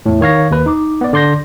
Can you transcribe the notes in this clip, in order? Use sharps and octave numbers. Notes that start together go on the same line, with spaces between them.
E2 A2
D#3 C#5 F5 A#6
D#2 B4
D#4 D6
B3 D5
D3 D5 C6 G6 A#6